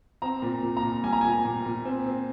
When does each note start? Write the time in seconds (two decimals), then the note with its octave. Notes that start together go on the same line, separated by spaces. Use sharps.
0.22 C4 A#5
0.42 A#2
0.63 A#2
0.77 A#5
0.83 A#2
1.03 G3 G#5
1.13 A#5
1.21 A#2 G#5
1.45 A#2
1.65 A#2
1.85 C4
2.06 C4